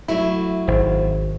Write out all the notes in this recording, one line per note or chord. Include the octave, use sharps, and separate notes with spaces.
F#3 A3 E4 E5
G#1 C5